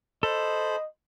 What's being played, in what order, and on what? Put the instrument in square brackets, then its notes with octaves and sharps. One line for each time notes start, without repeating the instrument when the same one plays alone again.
[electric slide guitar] A4 [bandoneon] C5 B5 [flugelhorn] D#5